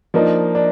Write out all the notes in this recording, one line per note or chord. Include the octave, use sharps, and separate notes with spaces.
F3 A#3 D4 D#4
D4